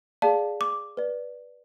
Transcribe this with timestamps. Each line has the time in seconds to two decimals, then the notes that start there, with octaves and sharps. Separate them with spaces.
0.22 G#4 D5 F5 A5
0.61 D6
0.97 B4 D5